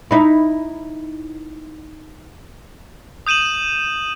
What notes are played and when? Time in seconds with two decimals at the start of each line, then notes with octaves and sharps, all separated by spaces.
0.11 D#4 E4
3.27 D#6 G6 D#7 E7 F#7